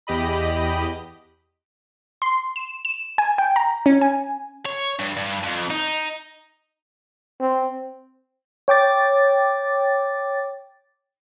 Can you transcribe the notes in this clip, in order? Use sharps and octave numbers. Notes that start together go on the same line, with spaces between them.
E2 G4 D#5 B5
C6
E7
E7
G#5
G5
A#5
C#4
G#5
C#5
G2
G2
F2
D#4
C4
C#5 G5 D6 A6